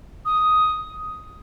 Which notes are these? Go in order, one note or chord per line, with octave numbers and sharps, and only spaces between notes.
D#6